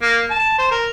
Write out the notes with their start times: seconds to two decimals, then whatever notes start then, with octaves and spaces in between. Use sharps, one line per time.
0.02 A#3
0.30 A5
0.58 C5
0.71 A#4